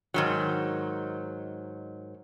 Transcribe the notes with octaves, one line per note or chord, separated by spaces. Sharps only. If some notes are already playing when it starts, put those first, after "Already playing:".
G#2 D#3 F#3